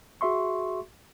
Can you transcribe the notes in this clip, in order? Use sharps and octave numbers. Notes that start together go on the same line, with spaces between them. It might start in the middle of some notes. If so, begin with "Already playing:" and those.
F#4 G#4 E5 C6 C#6